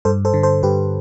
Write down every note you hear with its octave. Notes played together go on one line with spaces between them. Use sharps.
G2 A4 C5
A4 C5
D3
A4 C5
G2 G4 B4